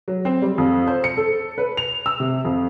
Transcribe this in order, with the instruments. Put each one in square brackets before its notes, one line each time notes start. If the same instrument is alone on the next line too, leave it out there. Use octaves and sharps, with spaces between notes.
[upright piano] F#3
C4
G3
F2
C5
C#7
A4
B4
F7
E6
C3
F2